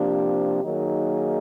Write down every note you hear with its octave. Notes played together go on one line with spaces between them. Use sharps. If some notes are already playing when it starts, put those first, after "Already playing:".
Already playing: C3 F3 A#3 D4 G4
D#3 F#3 A#3 D#4 G#4